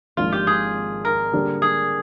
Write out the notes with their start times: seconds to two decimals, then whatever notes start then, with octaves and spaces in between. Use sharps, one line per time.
0.17 G#1 G#2 F3 A#3 D4 F4
0.32 G4
0.47 G#4
1.05 A#4
1.33 D3 G3 A#3 D4 G4
1.62 G#4